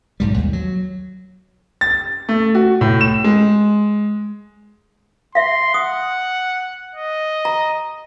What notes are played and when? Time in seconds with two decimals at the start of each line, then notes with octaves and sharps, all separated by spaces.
0.20 B1 G#2 G3
0.38 D#2
0.53 F#3
1.81 A6
2.29 A3
2.55 F#4
2.81 A2
3.01 E7
3.24 G#3
5.35 E5 F5 C6
5.74 F#5 D#6
6.95 D#5
7.45 A#5